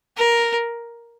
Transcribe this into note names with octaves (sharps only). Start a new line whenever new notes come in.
A#4